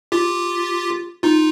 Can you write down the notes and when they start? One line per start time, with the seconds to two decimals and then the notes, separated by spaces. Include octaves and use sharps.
0.12 F4 G4
1.23 D#4 F4